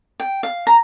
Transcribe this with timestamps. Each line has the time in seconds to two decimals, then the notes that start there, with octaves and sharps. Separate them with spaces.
0.20 G5
0.43 F5
0.67 A#5